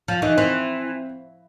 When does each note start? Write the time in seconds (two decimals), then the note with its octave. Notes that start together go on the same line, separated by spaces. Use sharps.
0.08 F3
0.22 E3 D#4
0.37 E3 C4